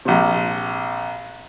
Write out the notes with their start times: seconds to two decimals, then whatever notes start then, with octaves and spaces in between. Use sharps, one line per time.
0.05 A#1 C3